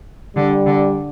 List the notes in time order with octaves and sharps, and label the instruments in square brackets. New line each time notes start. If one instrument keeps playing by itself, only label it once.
[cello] D3 [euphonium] G3
[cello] D3